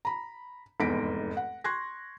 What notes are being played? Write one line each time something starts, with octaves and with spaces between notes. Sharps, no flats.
A#5 B5
F1 E2 G#2 A#6 B6 D7
F#5
C6 C#6 F#6 G#6 A#6